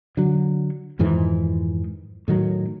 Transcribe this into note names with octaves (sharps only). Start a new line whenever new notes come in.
D3 F#3
F2 G#2 D#3 E3
A2 D#3 F#3